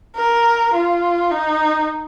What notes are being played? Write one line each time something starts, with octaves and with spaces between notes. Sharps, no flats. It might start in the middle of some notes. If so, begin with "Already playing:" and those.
A#4
F4
D#4